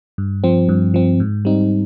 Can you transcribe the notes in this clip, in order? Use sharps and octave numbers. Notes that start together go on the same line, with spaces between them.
G2
F3 C4
G2
F3 C4
G#2
G3 C4 D#4